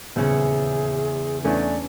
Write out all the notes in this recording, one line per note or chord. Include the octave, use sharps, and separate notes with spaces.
D#1 E2 C#3 C#4 G#4
E2 A3 C#4 D4 D5